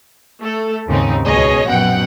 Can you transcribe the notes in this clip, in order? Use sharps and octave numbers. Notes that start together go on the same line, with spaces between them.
A3 A4
D#2 G#2 C#3 C4 D#4
C#2 B2 G#4 C#5 D#5 A#6
A#1 F#2 B2 F#5 G5